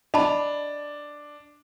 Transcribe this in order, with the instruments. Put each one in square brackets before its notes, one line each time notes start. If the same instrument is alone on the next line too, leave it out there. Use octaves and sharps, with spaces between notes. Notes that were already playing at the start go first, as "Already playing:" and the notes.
[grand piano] D4 [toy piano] D#5 A5 B5